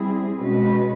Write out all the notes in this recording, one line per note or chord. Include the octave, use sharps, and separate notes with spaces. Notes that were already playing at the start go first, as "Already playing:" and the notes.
Already playing: G3 C4 E4 G#4
B2 G#3 C#4 F#4 B4